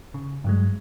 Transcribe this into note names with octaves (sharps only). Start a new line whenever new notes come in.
C#3
G2 F#3 G#3